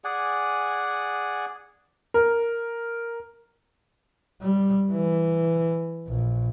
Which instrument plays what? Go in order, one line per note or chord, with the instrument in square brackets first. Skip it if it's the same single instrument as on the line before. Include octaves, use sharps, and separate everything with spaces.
[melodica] G#4 D5 F#5 G#5
[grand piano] A#4
[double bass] G3
E3
A#1